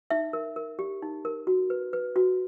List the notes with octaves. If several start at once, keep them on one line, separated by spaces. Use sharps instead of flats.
D#4 E5
A#4
A#4
G4
D#4
A#4
F#4
B4
B4
F#4